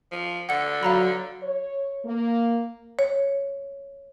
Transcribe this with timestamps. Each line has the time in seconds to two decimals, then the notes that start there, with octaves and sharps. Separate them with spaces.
0.11 F3
0.49 D3 F#5 C#7
0.83 F#3 F5 A#5 B5
1.43 C#5
2.05 A#3
2.99 C#5